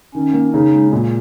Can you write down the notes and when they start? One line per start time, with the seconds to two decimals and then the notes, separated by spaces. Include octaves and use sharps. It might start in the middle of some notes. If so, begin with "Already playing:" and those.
0.15 D#3 C#4
0.33 A#3
0.53 C#3 D#4
0.73 G#3
0.93 A#2